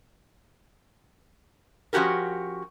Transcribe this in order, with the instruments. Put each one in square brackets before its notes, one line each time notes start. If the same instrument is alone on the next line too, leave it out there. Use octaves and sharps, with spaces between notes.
[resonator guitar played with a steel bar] F3 C#4 F#4 G4 A#4